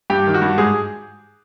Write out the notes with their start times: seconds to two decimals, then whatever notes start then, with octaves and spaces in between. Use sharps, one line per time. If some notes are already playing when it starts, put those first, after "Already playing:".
0.10 G2 G4
0.27 D#3
0.34 F#4
0.42 G2
0.58 G#2 G#4